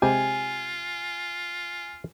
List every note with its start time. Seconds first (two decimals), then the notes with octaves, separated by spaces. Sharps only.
0.02 C3 G#3 F4 G4 G#5